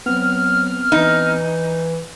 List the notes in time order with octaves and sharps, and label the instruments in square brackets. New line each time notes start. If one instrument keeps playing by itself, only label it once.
[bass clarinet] F#3 [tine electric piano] B3 C4 [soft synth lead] F6
[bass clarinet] E3 [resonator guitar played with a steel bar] D#4